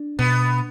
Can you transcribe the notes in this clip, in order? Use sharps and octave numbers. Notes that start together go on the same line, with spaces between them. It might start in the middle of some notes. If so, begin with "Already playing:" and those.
Already playing: D4
B2 B3